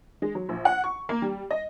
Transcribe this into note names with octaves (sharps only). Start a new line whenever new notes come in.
G#3
F#3
A#1
F#5
C#6
A#3
G3
D#5